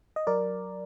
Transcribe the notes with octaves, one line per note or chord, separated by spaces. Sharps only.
D#5
F#3 A#4 D5